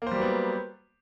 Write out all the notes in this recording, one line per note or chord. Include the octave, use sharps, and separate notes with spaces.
F#3 G3 A#3 B3 C5